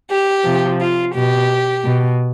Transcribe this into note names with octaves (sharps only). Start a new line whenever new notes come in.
G4
C3 F3
F4
B2 G4
B2